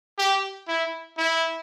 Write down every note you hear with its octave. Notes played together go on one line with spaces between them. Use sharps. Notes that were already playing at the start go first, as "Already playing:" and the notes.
G4
E4
E4